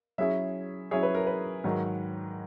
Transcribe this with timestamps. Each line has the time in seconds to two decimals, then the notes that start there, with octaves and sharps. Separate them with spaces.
0.18 F#3 C#4 E4 G#4 E5
0.91 F#3 C#4 E4 G#4 C#5
1.03 B4
1.15 A#4
1.27 B4
1.64 G#2 D#3 F#3